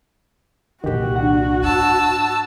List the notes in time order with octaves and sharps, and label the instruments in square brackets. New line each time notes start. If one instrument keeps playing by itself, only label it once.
[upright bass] C2 A#2 [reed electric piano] D#3 G4 [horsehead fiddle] F#4
[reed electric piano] D4 F#5
[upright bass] G#2 [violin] A5 E6